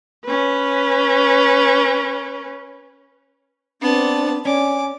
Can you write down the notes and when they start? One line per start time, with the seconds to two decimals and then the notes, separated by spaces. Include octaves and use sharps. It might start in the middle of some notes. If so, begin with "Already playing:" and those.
0.25 C#4 B4
3.82 B3 C4 D4 A5
4.45 C#4 D5 G#5 D6